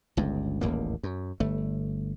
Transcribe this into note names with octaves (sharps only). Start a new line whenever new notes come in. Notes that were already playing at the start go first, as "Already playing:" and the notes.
G1 C#2 G2
D#1 A1 E2 A#3
F#2
G1 A3